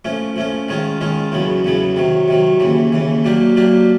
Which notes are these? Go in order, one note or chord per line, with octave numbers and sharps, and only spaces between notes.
F3 A3 C#4
F3 A3 C#4
D#3 G#3 C#4 F4
D#3 G#3 C#4 F4
E2 C#3 F#3 B3
E2 C#3 F#3 B3
C3 D#3 F#3
C3 D#3 F#3
D#2 C#3 E3
D#2 C#3 E3
F#3 A#3 D4 G4
F#3 A#3 D4 G4